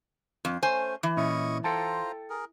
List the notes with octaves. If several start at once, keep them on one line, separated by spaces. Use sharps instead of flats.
F2
A3 C#4 C5 G#5
E3
A#2 C#4 E4 D#5 C#6
F4 A4 C5 G5 A5 A#5
G#4 A#4